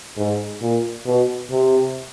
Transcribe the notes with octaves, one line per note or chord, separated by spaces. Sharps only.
G#2
A#2
B2
C3